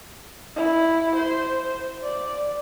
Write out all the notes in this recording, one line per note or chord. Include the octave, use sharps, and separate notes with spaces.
E4
C5
D5